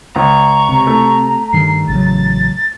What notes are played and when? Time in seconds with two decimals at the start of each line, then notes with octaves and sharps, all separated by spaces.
0.16 C#2 A#5 C#6
0.69 C3
0.87 A3
1.53 G2 D#3 G3 C7
1.88 A1 C#3 F#3 A6